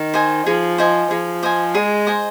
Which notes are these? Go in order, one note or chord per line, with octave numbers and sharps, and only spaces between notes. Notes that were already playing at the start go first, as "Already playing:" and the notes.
Already playing: D#3
C5 D#5 G#5
F3 G#4
C5 D#5 G#5
F3 G#4
C5 D#5 G#5
G#3 G#4
C5 D#5 G#5